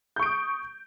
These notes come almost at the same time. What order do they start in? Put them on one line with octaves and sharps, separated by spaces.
G6 C#6 D7 D#6